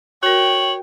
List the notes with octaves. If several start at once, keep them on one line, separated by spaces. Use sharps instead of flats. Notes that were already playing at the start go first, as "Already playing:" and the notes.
F#4 A#4 C#5 G5 F#7